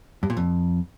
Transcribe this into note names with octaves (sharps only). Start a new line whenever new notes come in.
G2
A#2
F2